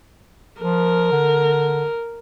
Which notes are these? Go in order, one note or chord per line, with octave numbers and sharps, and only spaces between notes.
F3 A#4
D3